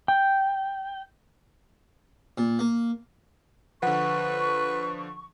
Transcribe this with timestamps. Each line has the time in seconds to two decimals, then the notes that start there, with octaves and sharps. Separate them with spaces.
0.08 G5
2.38 A#2
2.59 A#3
3.83 D3 F3 B4 F#5 C#6